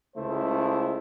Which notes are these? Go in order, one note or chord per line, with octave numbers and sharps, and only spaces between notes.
C#2 C#3 A3 E4 C5